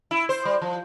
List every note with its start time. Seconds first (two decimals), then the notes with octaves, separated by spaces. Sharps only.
0.11 E4
0.29 C5
0.45 G3
0.62 F3